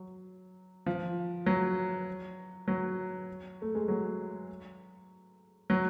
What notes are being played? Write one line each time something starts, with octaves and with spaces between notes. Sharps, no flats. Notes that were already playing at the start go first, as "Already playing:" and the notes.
Already playing: F#3
F3
F#3
F#3
A3
G#3
F#3
F#3